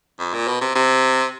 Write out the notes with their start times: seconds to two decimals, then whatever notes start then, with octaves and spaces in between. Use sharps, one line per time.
0.19 F2
0.34 A#2
0.47 B2
0.61 C3
0.75 C3